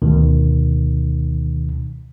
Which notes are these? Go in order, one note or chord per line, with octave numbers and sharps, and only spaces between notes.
D2 B2 D#3